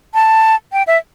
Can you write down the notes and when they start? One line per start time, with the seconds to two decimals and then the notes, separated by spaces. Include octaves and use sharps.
0.14 A5
0.73 G5
0.87 E5